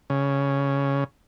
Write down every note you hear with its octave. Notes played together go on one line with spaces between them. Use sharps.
C#3